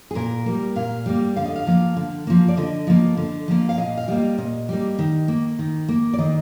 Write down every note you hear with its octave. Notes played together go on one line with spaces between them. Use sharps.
G#4
A#2 A#4
G3 A#3
A#2 F5
G3 A#3
D3 F5
D#5
F5
F3 A#3
D3
F3 A#3
D5
D3 D#5
F3 A#3
D3
F3 A#3
F5
A#2 D#5
F5
G3 A#3 D#5
A#2 D#5
G3 A#3
D#3
A#3
D#3
A#3
D5
D#3 D#5